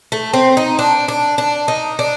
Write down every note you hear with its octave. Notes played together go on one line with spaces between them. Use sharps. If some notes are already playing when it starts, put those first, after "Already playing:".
A3
C4
D#4
D4
D4
D4
D#4
D4